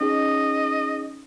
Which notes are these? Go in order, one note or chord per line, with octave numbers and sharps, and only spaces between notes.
C#4 D#4 G#4 D#5